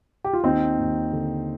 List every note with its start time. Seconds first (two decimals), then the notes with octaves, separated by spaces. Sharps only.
0.24 G4
0.33 F4
0.43 D#2 C4 D#4
0.78 D#2
1.13 D3